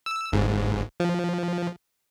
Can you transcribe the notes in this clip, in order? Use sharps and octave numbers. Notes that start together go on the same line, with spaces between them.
E6
G1 G#2
F3